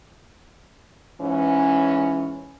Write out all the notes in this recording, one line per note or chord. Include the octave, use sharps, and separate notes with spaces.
G#2 E3 C#4